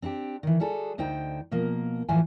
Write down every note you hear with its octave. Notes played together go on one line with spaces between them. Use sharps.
C4 D4 E4 G4
D#3 E3
G3 F#4 G#4 A4
D2 D3 D#4 C5 G5
B2 F3 A#3 A#4
A2 E3 F3 F4 F#4 G#5